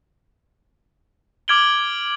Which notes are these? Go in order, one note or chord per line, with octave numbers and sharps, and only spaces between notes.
D6 F6 G#6 D7 F#7 G7